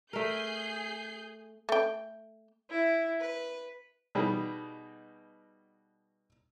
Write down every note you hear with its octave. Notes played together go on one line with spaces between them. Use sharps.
A3 G#4 A#4 G6 C7
A3 G5
E4
B4
B2 G3 D#4 G#4